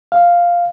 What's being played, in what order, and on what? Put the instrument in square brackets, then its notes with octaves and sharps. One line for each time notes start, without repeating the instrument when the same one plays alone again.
[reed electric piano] F5